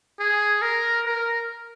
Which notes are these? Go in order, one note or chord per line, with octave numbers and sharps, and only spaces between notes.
G#4
A#4
A#4